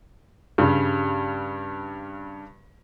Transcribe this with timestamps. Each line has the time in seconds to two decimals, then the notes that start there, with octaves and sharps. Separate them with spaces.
0.58 G2 C#3 G3